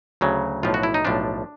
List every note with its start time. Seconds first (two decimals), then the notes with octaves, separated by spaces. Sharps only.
0.21 D2 C#3 F#3
0.63 B1 A2 F3 F4
0.74 F#4
0.83 E4
0.94 D#4
1.05 B1 A2 F3 D4